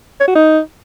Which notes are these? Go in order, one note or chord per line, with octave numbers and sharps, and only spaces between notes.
C#5
F#4
D#4